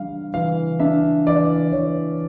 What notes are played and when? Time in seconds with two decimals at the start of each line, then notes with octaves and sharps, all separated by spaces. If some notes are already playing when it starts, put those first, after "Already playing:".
Already playing: E3 G3 D4 F5
0.34 E3 F5
0.79 D4 E5
1.26 E3 D5
1.72 E3 C#5